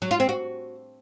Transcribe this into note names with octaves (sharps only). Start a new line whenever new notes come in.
F#3
F4
C4
F#4